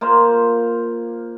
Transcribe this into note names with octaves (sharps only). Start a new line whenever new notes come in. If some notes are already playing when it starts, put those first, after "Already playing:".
A#3 F4 C5 F5